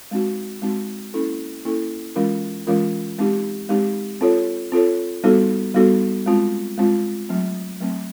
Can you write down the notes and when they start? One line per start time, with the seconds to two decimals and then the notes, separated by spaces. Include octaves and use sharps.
0.11 G#3 C4 D#4 F#4
0.62 G#3 C4 D#4 F#4
1.14 A#3 C#4 E4 A4
1.65 A#3 C#4 E4 A4
2.16 E3 G#3 C#4 F4 A#4
2.67 E3 G#3 C#4 F4 A#4
3.19 G#3 C4 D#4 G4
3.69 G#3 C4 D#4 G4
4.21 C4 F4 A4 C#5
4.72 C4 F4 A4 C#5
5.24 G3 B3 D#4 F#4 A4
5.74 G3 B3 D#4 F#4 A4
6.26 G#3 C4 F4
6.78 G#3 C4 F4
7.29 F#3 A3 C4
7.80 F#3 A3 C4